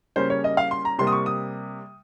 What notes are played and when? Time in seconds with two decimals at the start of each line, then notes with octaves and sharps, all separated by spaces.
0.16 C#3 G3 A#3 C#4 C5
0.30 C#5
0.44 D#5
0.57 F5
0.71 C6
0.85 A#5
0.98 C3 G3 A#3 C6
1.07 D#6
1.12 C#6
1.26 D#6